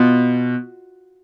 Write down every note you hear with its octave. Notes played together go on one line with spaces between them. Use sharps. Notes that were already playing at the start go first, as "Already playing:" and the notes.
Already playing: B2 B3 F4